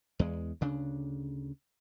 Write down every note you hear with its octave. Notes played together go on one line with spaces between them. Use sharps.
E2 G#3
D2 C#3 D4